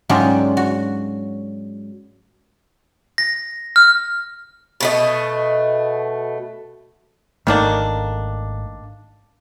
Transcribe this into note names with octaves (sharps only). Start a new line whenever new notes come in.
G#2 F#3 C#4 D4 F4 G4
F#4
A#6
F6
B2 A3 D#5
G#1 D#3 A3 A#3 D4